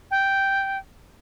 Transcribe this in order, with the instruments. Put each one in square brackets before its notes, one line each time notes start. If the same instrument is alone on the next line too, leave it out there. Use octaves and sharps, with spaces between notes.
[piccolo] G5